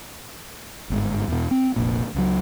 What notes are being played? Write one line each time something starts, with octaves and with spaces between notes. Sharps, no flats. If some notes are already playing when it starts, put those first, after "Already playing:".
G1 G#2
E2 B2
C4
F1 A#1 A#2
C#2 F#3